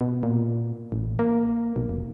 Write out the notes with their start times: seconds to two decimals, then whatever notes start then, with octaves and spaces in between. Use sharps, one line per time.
0.01 B2
0.23 A#2
0.92 A1
1.19 A#3
1.76 B1
1.89 F1